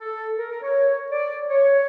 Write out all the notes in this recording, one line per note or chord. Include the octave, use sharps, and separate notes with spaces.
A4
A#4
A#4
C#5
D5
C#5